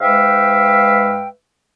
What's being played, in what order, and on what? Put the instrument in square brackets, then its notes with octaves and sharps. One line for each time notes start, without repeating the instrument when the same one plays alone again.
[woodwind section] G#2 G#3 B4 E5 F5 G5